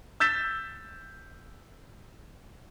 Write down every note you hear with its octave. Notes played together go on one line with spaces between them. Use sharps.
E6 G6 A6 B6 E7